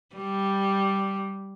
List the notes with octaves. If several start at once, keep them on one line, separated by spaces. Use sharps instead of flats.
G3